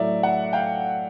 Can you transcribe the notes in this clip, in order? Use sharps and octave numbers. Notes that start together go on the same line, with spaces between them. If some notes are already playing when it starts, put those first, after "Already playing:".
Already playing: A2 F#3 A3 D5 E5
E5 F#5
F5 G5